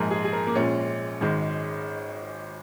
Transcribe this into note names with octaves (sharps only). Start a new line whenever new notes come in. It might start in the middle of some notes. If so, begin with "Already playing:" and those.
Already playing: A#1 G#2 F3 G#3 A#4
G#4
G#4
A#4
A#3
A#1 A#2 G#3 C#4
G#1 G#2 D#3 G#3